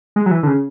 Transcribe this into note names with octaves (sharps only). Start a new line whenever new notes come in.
G#3
F#3
E3
D3
C#3